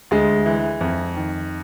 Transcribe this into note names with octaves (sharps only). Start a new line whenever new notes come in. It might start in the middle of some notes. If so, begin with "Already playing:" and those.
D2 G#3
E3
F2
D#3